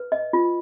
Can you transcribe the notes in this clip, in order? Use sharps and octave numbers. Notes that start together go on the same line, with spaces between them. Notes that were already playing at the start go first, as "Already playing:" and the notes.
Already playing: B4
D#5
F4